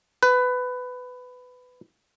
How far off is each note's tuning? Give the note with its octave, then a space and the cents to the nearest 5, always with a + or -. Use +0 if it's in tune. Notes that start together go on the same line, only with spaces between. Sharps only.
B4 +20